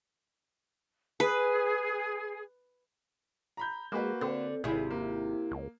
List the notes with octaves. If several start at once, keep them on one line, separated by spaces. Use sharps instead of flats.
G#4 B4
A#5 B5 G6
G#3 A#3 F#4 B4
D3 C4
G#1 C3 E4 G#4
A#3
C#2